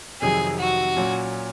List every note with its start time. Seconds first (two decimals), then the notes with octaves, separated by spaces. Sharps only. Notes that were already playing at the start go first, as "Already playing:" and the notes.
0.21 F2 C3 D#3 F#3 G#4
0.58 F#4
0.97 A#2 F#3 C#4